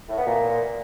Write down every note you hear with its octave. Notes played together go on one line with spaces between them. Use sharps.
A2
B3
A#2